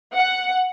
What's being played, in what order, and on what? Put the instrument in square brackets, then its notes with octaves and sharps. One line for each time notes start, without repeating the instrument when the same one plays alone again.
[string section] F#5